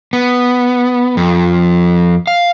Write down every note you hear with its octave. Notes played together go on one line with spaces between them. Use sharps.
B3
F2
F5